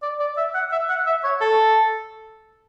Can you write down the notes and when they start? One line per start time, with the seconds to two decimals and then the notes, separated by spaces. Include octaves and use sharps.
0.02 D5
0.20 D5
0.37 E5
0.55 F#5
0.72 E5
0.89 F#5
1.06 E5
1.24 C#5
1.41 A4